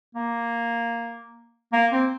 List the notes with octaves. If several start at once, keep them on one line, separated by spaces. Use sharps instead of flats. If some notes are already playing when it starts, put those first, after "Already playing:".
A#3
A#3
C4